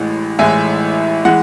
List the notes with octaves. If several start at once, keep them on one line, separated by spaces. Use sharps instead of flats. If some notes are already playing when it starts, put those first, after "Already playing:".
Already playing: A1 A2 E3 G#3
A1 A2 E3 G#3 E5 G#5
E3 G#3 F#5